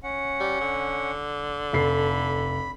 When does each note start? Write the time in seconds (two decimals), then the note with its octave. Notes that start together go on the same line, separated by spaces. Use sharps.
0.03 C#4 F#5
0.40 G3
0.61 D3
1.73 F1 A4 B5 C7